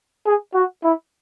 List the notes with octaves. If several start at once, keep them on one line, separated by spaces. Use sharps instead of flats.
G#4
F#4
E4